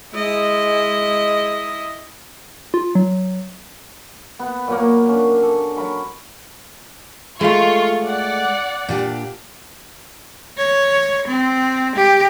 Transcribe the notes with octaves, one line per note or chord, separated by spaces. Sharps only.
G#3 E4 D#5
F4
F#3
B3 B4 F#5
A#2 F#3 A#3
C#4 D4
A4
F#3 A#4 B5 C#6
G#3 A3 F4 C#6
D5 F#5
A#2 D4 G4
C#5
C4
G4